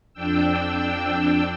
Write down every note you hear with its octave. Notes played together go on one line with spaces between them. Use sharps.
F2 D4 G5 E6